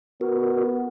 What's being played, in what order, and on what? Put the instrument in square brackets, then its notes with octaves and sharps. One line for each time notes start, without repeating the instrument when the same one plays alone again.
[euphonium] B3 [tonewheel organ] F#4 A#4